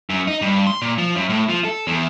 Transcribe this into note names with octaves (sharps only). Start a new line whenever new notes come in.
F#2
D#4
G2
C6
A#2
F3
F#2
A2
F3
A4
E2